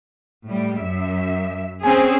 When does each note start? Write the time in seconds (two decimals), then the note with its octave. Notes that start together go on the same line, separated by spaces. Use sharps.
0.47 A2 G3
0.78 F#2 E5
1.83 C4 C#4 G#4 G#5